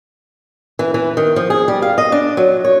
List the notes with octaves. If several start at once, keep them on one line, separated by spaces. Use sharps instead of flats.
E3
E3
D#3
F3
G#4
G3
F5
D#5
D4
F#3
C#5